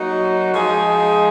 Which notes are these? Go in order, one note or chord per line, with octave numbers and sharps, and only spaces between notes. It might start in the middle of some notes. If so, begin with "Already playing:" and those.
Already playing: F#3 A#3 D#4 F#4
F3 G#3 D#4 G#4